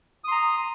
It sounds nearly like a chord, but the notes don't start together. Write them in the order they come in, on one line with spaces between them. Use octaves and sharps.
D#6 C6 A#5